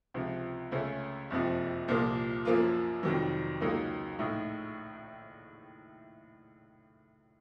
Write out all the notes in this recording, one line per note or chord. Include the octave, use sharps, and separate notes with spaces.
C#2 C3 F3
C#2 C#3 A3 C#4
F#1 F2 C3 F3
C2 A#2 F3 A#3
F#2 F3 A#3 F4
F1 F2 D#3 F#3
C#2 C#3 F#3 A#3 D#4
A#1 A2 A3 D#4